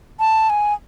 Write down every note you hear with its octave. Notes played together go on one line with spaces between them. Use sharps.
A5
G#5